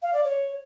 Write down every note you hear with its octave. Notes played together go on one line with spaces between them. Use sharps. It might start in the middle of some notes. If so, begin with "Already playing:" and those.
F5
D5
C#5